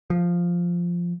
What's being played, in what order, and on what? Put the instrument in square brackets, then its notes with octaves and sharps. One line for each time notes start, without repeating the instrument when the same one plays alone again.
[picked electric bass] F3